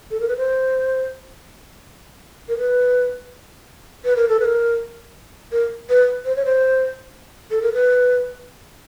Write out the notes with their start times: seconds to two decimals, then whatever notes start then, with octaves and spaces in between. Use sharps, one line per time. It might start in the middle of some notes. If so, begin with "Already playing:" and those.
0.11 A4
0.20 A#4
0.29 B4
0.37 C5
2.49 A#4
2.58 B4
4.05 B4
4.16 A#4
4.29 A4
4.40 B4
4.45 A#4
5.52 A#4
5.90 B4
6.25 C5
6.36 C#5
6.45 C5
7.51 A4
7.62 A#4
7.73 B4